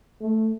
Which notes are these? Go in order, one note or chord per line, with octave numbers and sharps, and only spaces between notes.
A3